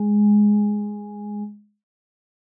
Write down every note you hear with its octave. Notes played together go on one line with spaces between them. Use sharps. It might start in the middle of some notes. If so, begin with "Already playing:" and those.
Already playing: G#3